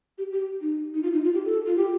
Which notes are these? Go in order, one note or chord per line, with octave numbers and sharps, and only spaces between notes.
G4
G4
D#4
D#4
F4
D#4
F4
G4
A4
F4
G4